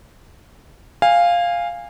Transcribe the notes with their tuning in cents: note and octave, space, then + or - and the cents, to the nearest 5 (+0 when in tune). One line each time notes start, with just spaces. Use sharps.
F5 +0 G#5 -25